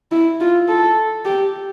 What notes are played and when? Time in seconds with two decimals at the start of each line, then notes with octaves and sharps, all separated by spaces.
0.12 E4
0.40 F4
0.68 A4
1.25 G4